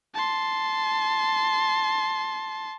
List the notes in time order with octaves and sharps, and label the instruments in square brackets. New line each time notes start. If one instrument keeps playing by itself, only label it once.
[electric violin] A5 C6